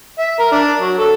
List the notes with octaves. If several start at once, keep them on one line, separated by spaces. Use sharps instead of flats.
E5
A#4
D4
F#3
A4